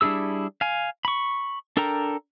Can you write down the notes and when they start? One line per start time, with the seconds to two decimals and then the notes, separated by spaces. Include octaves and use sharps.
0.01 G3 D4 E4 G#4 E6
0.61 F5 G#5
1.05 B5 C#6
1.77 D4 A4 A#4 G5 A#5